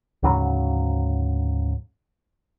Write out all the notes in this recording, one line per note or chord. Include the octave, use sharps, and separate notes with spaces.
D2 G#2 C#3 F#3